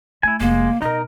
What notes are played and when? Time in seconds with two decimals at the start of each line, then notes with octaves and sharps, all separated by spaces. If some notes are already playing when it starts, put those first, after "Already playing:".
0.23 A3 E4 G#5
0.40 F1 G#3 A#3
0.82 B2 D#4 A#4 D#5